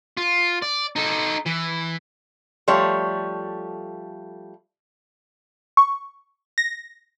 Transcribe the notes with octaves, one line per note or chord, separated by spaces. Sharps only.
F4
D5
D#4 A4
E3
F3 G3 A3 C#5
C#6
A#6